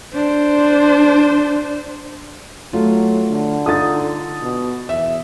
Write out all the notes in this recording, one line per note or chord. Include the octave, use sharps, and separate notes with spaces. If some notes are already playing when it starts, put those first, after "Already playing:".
D4 C5
F#3 A3 F4
D3
D#4 F4 A4 D#6 A6
B2
E2 E5